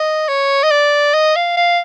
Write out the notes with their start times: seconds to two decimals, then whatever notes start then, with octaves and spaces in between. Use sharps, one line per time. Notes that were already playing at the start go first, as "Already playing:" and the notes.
Already playing: D#5
0.28 C#5
0.63 D#5
0.71 D5
1.14 D#5
1.36 F5
1.57 F5